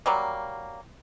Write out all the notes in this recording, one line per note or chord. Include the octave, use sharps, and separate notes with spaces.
F#3 G3 A#3